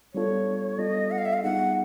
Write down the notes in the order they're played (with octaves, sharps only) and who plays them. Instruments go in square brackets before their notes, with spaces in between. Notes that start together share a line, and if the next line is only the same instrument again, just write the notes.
[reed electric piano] G3 B3 D4 F4 A4 [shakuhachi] C#5
[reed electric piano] G3 B3 D4 F4 A4 [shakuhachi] D#5
[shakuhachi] F#5
F5
E5
F5
[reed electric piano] G3 B3 D#4 G#4 [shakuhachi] F#5